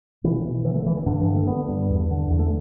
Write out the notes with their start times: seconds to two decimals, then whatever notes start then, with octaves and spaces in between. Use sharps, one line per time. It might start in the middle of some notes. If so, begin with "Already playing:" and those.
0.24 B2 E3
0.45 B2
0.65 D3 E3
0.75 A3
0.86 D3 E3
0.97 E3
1.06 G2 D3
1.21 E3
1.27 D3
1.35 A3
1.47 D3 B3
1.68 G2
1.90 E2
2.11 D3
2.30 E2
2.39 A3